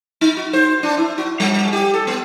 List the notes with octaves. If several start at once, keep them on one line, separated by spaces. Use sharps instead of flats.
D#4
F#4
C5
D4
E4
F#4
G3
G4
A4
B3